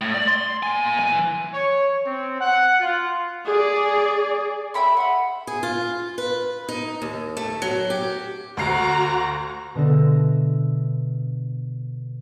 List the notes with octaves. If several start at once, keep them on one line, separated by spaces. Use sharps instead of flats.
A2
D5
C6
A#2 G#5
E3 G#5
C#5
C4
F#5
F4
G#4 D5
E5 G5 B5 C6
F#5 B5
G#4
F4
B4
D#4
D#2
A3
F#3
G4
D2 F#4 F5 A#5 C7
B2 D3 E5 A#6